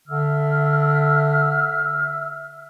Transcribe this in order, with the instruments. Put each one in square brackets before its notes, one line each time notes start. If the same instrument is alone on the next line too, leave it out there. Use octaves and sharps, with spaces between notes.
[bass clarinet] D3 [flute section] E5 E6 F6